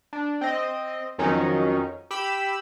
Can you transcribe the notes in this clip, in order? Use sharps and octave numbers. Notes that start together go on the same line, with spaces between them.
D4
C4 D#5
F2 D#3 F#3 C#4 D#4
G4 B5 E6